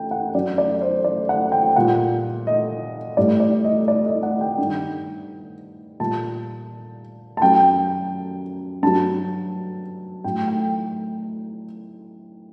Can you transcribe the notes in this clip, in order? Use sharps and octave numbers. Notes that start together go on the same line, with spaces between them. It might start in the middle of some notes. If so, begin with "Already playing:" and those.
Already playing: F#2 G5
F#5
F#2 F#3 D5
D5
C5
D5
F#5
G5
A#2 G3 F#5
D#5
A2 G3 D5
D5
D#5
D5
D#5
F#5
G5
G2 D#3 G3
A#2 G3 A5
A5
F#2 F#3 G5
G2 F#3 A5
A2 F#3 G5
G5